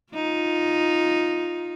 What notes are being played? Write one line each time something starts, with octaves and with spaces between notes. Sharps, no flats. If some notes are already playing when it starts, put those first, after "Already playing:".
D#4 F4